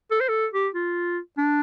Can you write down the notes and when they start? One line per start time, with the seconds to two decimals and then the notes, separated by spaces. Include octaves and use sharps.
0.11 A4
0.21 C5
0.29 A4
0.54 G4
0.74 F4
1.38 D4